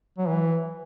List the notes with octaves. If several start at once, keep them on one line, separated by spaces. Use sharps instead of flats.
F#3
E3